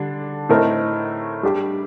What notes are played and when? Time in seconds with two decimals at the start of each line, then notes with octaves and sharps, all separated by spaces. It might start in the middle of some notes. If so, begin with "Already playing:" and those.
Already playing: D3 G3 D4
0.49 A2 A3 C4 D#4 A#4
1.43 G3 D4 G4